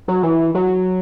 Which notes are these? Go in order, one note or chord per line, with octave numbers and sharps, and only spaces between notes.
F#3
E3
F#3